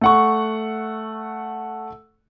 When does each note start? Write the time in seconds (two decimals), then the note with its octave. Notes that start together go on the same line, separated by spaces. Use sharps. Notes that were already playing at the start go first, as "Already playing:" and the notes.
0.01 A3 F#5 C#6